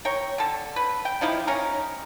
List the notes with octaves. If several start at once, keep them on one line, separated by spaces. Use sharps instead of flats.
A#4 C#5 G5
D3 A4
B4
G5
F3 D#4 E4 G4
C#4 D#4 A#4